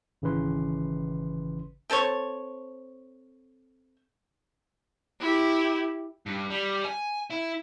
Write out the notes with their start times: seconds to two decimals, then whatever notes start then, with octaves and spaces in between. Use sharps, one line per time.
0.22 G#1 C#3 E3 C#4 B4 C6
1.90 C4 A4 C5 C#5
5.20 E4 G4
6.26 G2
6.50 G3
6.85 G#5
7.30 E4